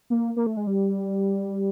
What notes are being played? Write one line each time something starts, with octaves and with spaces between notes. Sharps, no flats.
A#3
A#3
A3
G#3
G3